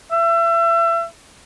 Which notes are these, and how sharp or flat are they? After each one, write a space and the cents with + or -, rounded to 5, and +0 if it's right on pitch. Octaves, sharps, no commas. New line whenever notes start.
E5 +35